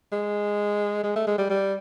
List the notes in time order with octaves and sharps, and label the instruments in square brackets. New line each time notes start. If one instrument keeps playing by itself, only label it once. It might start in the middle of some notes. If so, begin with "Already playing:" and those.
[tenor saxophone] G#3
G#3
A3
G#3
G3
G3